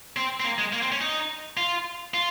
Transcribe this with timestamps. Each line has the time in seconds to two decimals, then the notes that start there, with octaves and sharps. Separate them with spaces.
0.17 C4
0.40 C4
0.44 A#3
0.58 G#3
0.73 A#3
0.82 C4
0.92 C#4
1.01 D#4
1.57 F4
2.14 F4